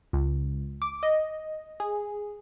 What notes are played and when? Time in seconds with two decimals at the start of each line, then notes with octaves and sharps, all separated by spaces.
0.13 C#2
0.82 D6
1.03 D#5
1.80 G#4